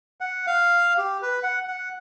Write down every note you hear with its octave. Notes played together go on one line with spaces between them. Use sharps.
F#5
F5
G4
B4
F#5
F#5